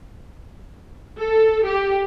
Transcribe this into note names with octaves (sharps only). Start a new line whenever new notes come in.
A4
G4